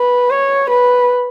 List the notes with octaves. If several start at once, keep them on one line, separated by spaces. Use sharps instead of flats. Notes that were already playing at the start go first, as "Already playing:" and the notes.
Already playing: B4
C#5
B4